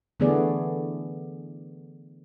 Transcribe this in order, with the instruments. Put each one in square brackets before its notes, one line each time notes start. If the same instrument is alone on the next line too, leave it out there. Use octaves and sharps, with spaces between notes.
[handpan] D3 E3 A3 B3 G#4 D5